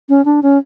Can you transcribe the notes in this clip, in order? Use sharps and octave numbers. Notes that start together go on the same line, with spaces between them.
C#4
D4
C#4